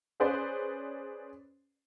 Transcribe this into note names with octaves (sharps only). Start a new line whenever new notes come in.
C#4 G#4 B4 C5 D5